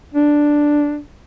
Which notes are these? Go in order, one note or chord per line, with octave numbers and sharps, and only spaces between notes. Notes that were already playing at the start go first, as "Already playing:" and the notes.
D4